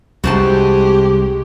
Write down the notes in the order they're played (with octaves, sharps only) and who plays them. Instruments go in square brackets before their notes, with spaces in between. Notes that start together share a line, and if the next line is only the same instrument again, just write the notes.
[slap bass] C2 [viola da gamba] G#3 G4 [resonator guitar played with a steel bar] F#4 C5 A5